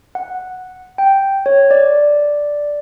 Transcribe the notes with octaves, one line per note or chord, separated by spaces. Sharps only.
F#5
G5
C#5
D5